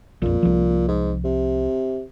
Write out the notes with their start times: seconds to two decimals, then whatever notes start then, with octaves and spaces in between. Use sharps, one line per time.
0.22 A#1 F2 A#2
0.43 C2 F3
0.88 G#2
1.24 C3